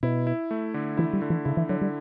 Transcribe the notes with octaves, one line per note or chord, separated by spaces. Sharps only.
B2 E4
E4
A3
D3
E3 E4
G3
D3
E3
C#3 E4
E3
D3 F#3
G3